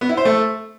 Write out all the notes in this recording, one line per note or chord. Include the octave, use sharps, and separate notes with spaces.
B3
E4
C5
A3